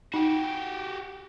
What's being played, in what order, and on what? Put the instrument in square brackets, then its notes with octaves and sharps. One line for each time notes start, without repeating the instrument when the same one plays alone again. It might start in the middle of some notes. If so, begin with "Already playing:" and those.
[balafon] D#4 [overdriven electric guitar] F#4 G4